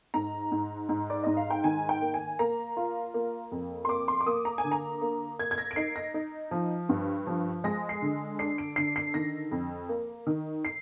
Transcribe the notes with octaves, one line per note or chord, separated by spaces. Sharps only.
G#2 A#5
G#2
G#2
D5
G#2 D#5
F5
G5
D#3 G#5
G5
A#3
G#5
A#3 A#5
F4
A#3
F2
C6
A#3 D6
C6
D6
A#3 D#6
A#5
G#5
D3
A#5
A#3
A#3 G#6
G#6
A#6
D7
D#4 C7
A#6
D#4
F3
G2
F3
G#3 A#6
C7
D3
D4 C7
D7
D3 C7
C7
D#3 A#6
F2
A#3
D#3
C7